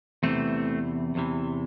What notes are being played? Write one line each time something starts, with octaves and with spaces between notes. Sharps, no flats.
E2 C3 E3 A3 C4
E2 C3 E3